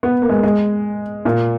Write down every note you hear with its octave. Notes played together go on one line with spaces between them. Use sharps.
B3
A#3
G#3
G#3
A#2